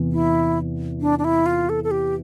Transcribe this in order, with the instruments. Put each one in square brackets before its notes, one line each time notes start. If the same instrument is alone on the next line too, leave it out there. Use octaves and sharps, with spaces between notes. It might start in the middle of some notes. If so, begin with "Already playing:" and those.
Already playing: [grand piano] E2 C3 E3 B3
[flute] E4
D4
D4
E4
F4
A4
A4
G4